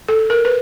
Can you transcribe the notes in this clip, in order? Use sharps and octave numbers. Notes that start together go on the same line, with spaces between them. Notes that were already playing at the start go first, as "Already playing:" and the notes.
A4
A#4
B4